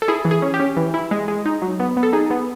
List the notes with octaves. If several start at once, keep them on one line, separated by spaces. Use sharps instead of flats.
A4
E4 G#4
E3
G#4
C#4
G4
C#4
E3
E4
G#3
G#3
D#4
F#3
B3
B3
A4
D#4 G#4
B3